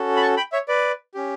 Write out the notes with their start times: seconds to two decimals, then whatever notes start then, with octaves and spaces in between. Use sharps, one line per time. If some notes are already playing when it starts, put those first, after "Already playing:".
Already playing: C#4 F#4 A4
0.16 B5
0.22 A5 C#6
0.37 G5 B5
0.52 C#5 E5
0.68 B4 D5
1.14 C#4 G4